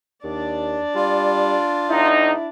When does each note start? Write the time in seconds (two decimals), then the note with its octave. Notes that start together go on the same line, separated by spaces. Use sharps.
0.24 D#2 D4 D5
0.95 G3 F4
1.89 E2 D#4 E4